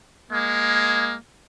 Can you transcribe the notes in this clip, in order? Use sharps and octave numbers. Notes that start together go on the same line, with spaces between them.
G#3 A#3